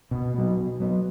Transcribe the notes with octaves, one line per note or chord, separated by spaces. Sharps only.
B2
F#3 B3
B2
F#3 B3